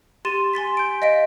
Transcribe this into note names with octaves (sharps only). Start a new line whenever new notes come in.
G4 C6 A6 D#7 E7
G#5 C6 A6 B6
G6 D7
D#5 F5 B6 D7